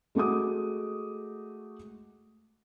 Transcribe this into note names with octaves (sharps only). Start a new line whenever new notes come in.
G#3 A3 F#4 D6 D#6